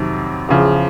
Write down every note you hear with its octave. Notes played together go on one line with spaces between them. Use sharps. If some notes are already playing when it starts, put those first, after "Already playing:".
Already playing: F2 C3 D#3 F#3
E2 C#3 F3